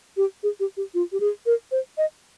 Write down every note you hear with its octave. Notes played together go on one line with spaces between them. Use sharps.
G4
G#4
G4
G4
F4
G4
G#4
A#4
C5
D#5